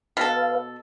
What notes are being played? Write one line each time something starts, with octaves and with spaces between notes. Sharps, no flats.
B2 A4 B4 F5